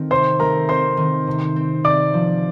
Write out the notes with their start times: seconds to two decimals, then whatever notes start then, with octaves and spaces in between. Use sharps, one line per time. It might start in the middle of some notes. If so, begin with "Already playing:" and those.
Already playing: D#3 A3 C4
0.11 C3 C5 C6
0.40 A3 A#4 A#5
0.69 C4 C5 C6
0.97 D#3
1.27 C3
1.56 C4
1.84 C3 D5 D6
2.14 F3